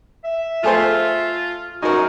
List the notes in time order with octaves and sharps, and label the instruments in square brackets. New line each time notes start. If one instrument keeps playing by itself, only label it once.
[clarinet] E5
[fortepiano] A3 G#4 C5 [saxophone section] F4
[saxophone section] F#2 G#3 [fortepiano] D#4 A#4 [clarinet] F#4